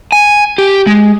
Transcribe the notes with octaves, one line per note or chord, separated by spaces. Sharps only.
G#5
G4
G#3